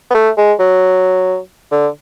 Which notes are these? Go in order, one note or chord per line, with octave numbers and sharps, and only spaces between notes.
B3
A3
G#3
F#3
D3